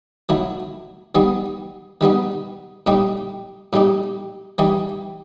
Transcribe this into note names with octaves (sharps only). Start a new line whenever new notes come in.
D#3 F#3 A3 E4
D#3 G3 B3 D#4
D#3 G3 B3 D#4
A2 G3 D#4 G4
A2 G3 D#4 G4
E3 G3 D#4 G4